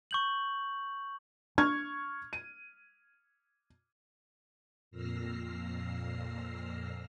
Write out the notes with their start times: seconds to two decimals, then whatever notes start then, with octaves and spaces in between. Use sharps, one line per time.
0.11 C#6 G6 F#7
1.58 D4 C#6 F6 G#6
2.33 D#7
4.91 F2 A#2 E6 F6 A#6 C7